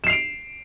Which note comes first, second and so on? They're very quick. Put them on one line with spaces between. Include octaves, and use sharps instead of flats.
E7 C7 F7 D7